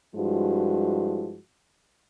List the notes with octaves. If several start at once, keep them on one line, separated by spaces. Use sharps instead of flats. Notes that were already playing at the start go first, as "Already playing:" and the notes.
G2 F3 G#3 E4 F#4